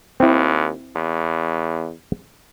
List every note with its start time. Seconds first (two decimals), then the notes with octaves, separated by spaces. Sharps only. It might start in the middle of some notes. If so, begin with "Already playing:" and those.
0.20 D#2 C4 E4
0.96 E2